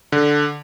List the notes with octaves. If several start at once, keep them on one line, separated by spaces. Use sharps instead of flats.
D3